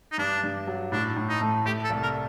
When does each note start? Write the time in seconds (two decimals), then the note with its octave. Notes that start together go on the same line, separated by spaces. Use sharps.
0.12 D#4
0.18 G2 D4
0.44 G2
0.67 F#3
0.92 A2 D4
1.16 A2
1.29 D#4
1.41 A3
1.66 A3 G4
1.84 A4
1.90 C2
2.03 A#4